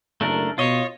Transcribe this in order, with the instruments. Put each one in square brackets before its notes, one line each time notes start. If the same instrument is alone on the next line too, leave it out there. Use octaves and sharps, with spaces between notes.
[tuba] F#1 [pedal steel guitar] A3 D4 A#4
[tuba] B2 [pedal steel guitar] F4 D#5 [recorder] C#5